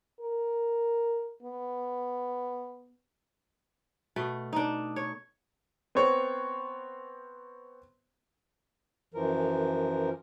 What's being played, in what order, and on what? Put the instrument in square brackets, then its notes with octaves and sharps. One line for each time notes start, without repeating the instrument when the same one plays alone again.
[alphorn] A#4
B3
[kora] B2 A3
D4 D#4
C#5
[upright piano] B3 C4 C5 C#5
[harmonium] F#2 E3 F3 A#4